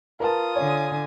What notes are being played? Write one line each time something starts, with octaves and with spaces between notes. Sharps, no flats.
F4 A#4 B4 A5 D#6
D3 C#5 G#5